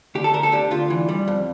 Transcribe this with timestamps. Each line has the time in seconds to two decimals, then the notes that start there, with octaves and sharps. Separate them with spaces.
0.15 D2 G4
0.24 A4
0.33 D2 A#4
0.43 A4
0.52 D3 G4
0.71 D2 F4
0.90 E3
1.09 G3
1.28 F2